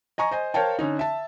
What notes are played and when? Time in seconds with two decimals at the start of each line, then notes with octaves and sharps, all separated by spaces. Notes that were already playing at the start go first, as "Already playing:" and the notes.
0.18 D#5 G#5 A#5 C#6
0.31 C5 D#5 G#5
0.54 A#4 C5 C#5 F5 G5 A5
0.79 D3 C#4 D#4
0.99 E5 A5